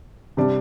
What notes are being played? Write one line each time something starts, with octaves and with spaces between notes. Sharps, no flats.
C3 G3 D4